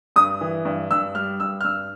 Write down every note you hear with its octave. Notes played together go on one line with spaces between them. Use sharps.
G2 D#6
E3
G2
G2 E6
G3 F6
G2 E6
F6
G2 E6